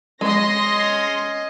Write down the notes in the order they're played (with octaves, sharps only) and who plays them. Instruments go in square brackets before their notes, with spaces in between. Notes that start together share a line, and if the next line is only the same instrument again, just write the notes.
[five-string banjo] G#3 [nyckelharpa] C#4 D#5 [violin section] C6 A#6